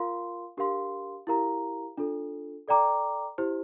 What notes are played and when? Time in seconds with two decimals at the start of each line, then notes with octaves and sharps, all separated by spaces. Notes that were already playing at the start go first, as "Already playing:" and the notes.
Already playing: F4 A#4 F5 C6
0.57 D4 G4 A#4 F5 C6
1.27 E4 G4 A#4 F5 A#5
1.98 D4 F4 A4
2.68 A4 D5 G5 A#5 D6
3.38 E4 G4 C5